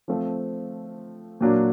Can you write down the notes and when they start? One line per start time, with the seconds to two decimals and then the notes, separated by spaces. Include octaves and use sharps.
0.08 F3 A3 C4 F4
1.41 A#2 F#3 A#3 D4 F#4